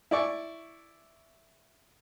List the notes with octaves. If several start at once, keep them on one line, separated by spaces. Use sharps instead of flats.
E4 D5 C#6